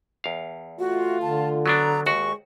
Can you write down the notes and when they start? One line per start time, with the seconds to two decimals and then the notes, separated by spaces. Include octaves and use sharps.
0.24 E2 F5
0.79 A3 F4 F#4
1.22 D3 A5
1.66 F#3 B3 D4 A#5
2.06 D#2 G#3 F#4 C#6